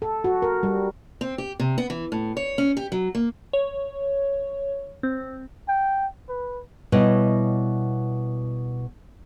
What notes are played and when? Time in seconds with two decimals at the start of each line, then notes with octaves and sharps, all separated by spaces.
0.02 A4
0.24 F#4
0.42 A#4
0.63 G3
1.21 C4
1.38 G4
1.59 C3
1.78 B3
1.90 E3
2.12 A2
2.37 C#5
2.58 C#4
2.77 G4
2.92 F#3
3.15 A#3
3.53 C#5
5.03 C4
5.68 G5
6.29 B4
6.92 B2 G3 E4 C#5 D#5